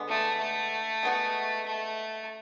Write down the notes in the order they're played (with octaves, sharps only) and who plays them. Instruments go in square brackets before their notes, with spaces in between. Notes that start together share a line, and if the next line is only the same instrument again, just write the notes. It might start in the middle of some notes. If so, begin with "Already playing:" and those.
Already playing: [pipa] D3 G#3 B3
[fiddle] A3
A3
[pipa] G#3 B3 F#4
[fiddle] A3